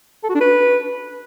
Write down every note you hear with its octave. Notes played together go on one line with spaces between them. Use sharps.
A4
F#4
D4
B4